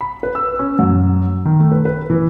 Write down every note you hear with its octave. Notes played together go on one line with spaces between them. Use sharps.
B5
B4
E6
C#4
F#2
D#3
A3
B4
B4
E3